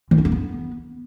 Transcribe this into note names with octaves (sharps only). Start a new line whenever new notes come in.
E3
C#4
A#3
B3